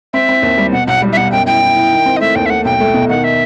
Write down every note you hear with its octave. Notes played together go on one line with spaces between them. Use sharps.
C4 E5
C4
D#2
G3
B2 F#5
B1 F#5
G3
E5
B2 F#5
F#2 G5
E4 G5
E4
E4
D#3
C4
D#5
A3 E5
D#2 G5
E5
A3 F#5
B1 G5
A3
B2
D#3 F#5
E5